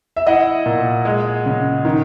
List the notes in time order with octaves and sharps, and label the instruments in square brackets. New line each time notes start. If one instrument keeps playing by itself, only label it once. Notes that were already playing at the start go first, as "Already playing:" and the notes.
[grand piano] E5
E4 D#5 F#5
A#2
G#3
C#3
D#3